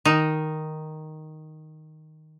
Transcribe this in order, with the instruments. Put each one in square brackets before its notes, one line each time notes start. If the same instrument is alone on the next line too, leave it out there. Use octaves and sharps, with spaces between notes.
[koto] D#3 D#4